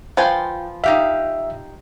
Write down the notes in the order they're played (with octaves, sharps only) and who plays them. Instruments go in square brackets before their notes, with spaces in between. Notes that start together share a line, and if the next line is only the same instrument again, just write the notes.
[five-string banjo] F3 B4 G#5 [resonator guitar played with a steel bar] F4 G5
[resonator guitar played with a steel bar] D#4 G4 F5 [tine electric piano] E5